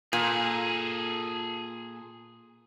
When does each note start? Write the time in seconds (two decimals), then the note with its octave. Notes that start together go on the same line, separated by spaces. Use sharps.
0.13 A#2 G#4 A4